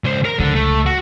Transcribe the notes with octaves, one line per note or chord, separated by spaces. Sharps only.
C#2 C5
A#4 A#5
C#2 D3
A3
F#4